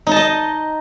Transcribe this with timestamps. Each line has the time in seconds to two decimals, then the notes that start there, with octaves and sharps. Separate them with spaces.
0.07 D#4
0.11 A5
0.16 D#5